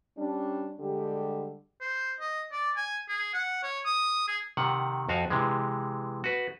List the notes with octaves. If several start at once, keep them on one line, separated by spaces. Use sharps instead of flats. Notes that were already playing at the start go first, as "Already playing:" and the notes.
G3 C#4 D4
D3 G3 G#3 G4
C5
D#5
D5
G#5
G#4
F#5
C#5
D#6
G#4
C3 D#3 F#5
F2 F#4 F5 G#5
C3 E3 G#3
F#4 B4